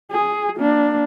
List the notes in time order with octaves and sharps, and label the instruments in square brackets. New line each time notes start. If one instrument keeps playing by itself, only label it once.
[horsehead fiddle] G#4
A#3 D4